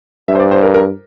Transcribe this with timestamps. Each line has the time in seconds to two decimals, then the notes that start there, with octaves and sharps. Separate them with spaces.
0.28 G2 E5
0.35 C5
0.39 D5
0.51 C5
0.63 A#4
0.74 A#4